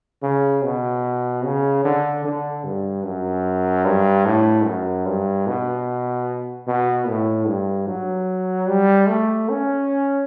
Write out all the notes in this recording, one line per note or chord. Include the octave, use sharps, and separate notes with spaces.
C#3
B2
C#3
D3
D3
G2
F#2
G2
A2
F#2
G2
B2
B2
A2
G2
F#3
G3
A3
C#4